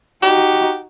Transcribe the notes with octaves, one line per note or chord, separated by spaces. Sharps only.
D#4 F#4 G4